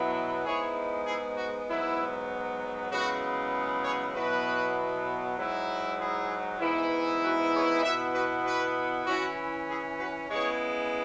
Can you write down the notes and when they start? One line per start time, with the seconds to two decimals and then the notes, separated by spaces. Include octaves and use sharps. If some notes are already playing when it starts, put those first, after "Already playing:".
Already playing: B2 F#3 B3 E4
0.45 G#2 G#3 B3 E4 G#4 C#5
1.06 E4 G#4
1.37 F#4
1.68 G#2 F#3 B3 E4
2.91 F#2 C#3 G#3 B3 E4 F#4
3.84 G#4 C#5
4.14 B2 F#3 B3 E4 F#4 B4
5.38 G#2 F#3 E4
5.99 E4 G#4
6.60 G#2 E3 B3 E4
7.21 F#4 B4
7.52 G#4 C#5
7.83 B2 B3 E4 B4 E5
8.14 F#4 B4
8.45 F#4 B4
9.06 E3 C#4 E4 F#4
9.68 E4 G#4
9.98 F#4 B4
10.29 C#3 G#3 B3 E4 G#4 C#5